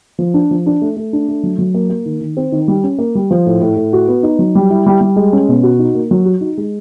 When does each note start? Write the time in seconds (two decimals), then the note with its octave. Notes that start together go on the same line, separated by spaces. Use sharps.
0.19 F3
0.34 D4
0.51 F3
0.66 D4
0.81 A3
0.97 A3
1.13 D4
1.28 A3
1.43 F#3
1.59 F#3
1.74 A#3
1.90 A#3
2.06 D#3
2.21 D#3
2.37 C4
2.52 D#3
2.68 G3
2.84 C#4
2.99 A#3
3.15 G3
3.31 F3
3.46 A2
3.61 A2
3.76 A2
3.93 F#4
4.08 B3
4.23 D#4
4.39 F#3
4.55 G3
4.70 E4
4.86 G3
5.01 G3
5.16 G#3
5.33 C#4
5.49 B2
5.63 F#4
5.79 D#4
5.95 A#3
6.11 F#3
6.25 F#4
6.41 D#4
6.58 G#3